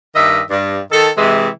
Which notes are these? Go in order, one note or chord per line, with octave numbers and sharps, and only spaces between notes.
G2 D#3 D#5 E5
G2
D#3 A4
C3 E3 G#3